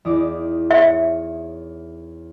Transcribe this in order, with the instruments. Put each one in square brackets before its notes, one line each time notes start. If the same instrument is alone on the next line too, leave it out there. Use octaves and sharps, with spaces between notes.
[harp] E2 D#4 D6
[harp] C#5 [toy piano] E5